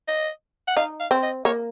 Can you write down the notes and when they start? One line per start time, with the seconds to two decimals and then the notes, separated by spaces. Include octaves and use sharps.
0.08 D#5
0.68 F#5
0.77 D#4 F5
1.00 F5
1.11 C4
1.23 D#5
1.45 A#3 C#5